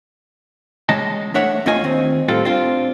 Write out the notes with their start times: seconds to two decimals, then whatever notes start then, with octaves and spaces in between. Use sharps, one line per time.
0.89 E3 G#3 C#4 D#5 A5
1.34 A3 D4 C#5 E5 F#5
1.66 E2 A3 C#4 F4 D#5 G#5
1.84 D#2 C4
2.28 A2 G3 C4 F4 A4
2.45 C4 D4 F4